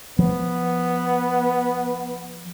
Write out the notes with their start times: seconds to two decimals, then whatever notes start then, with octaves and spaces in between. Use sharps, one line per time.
0.19 F3 B3